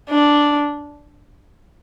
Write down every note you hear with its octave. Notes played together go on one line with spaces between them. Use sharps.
D4